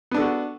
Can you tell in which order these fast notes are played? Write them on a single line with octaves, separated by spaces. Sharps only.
B3 D4 A4 F#4